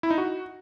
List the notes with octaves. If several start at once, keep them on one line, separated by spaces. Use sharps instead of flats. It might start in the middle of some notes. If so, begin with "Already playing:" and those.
E4
D#4
F#4